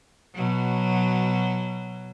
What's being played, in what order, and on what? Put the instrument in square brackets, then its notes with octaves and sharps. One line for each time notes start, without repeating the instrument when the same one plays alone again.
[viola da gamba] B2 F#3